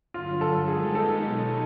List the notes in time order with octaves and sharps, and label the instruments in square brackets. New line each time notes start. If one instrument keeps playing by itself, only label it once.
[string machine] G2 D3 F#3 [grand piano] F4
[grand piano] A4
[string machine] D#3 G#3 B3 D#4 G4 [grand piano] G#4
[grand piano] A4
[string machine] B2 F#3 B3 D#4